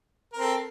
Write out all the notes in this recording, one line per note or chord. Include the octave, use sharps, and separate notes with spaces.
C4 A4 A#4